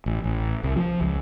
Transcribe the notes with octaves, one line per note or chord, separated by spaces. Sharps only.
A1
A1
C2
F3
C#2